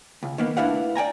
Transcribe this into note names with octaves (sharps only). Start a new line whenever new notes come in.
C#2
D#3 A#3 B3
A3 D4 E4 B4 F5 F#5
D5 G5 G#5 A#5